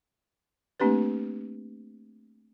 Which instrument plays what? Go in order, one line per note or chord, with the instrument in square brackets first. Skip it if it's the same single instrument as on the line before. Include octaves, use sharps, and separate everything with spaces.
[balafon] A3 A#3 C4 D4 G4 B4